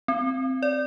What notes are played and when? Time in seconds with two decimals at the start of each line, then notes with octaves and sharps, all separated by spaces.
0.08 C4
0.63 D5